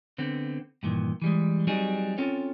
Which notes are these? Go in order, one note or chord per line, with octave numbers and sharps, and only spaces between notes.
D3 B3 C4
G2 A#2 D#3 E3
E3 G3 G#3
F#3 G3 C4 D#4 G#4
C4 C#4 F4 A4 C#5